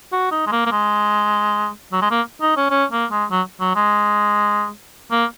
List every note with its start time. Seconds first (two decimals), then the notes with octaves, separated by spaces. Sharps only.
0.12 F#4
0.31 D#4
0.47 G#3
0.52 A#3
0.66 A#3
0.72 G#3
1.92 F#3
2.02 G#3
2.11 A#3
2.41 D#4
2.56 C#4
2.71 C#4
2.92 A#3
3.11 G#3
3.31 F#3
3.61 F#3
3.75 G#3
5.11 A#3